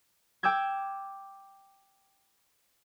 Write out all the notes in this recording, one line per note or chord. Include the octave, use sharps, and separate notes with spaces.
G5 D6 E6 G6 G#6